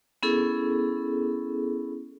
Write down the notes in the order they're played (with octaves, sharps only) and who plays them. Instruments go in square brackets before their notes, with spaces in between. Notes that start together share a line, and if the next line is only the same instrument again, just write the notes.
[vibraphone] B3 C#4 E4 G#4 A4